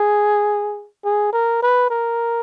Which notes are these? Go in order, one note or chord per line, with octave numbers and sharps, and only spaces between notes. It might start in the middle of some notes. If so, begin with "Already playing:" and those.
Already playing: G#4
G#4
A#4
B4
A#4